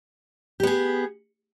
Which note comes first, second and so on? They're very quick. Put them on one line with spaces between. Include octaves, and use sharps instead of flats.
G4 B3 G#4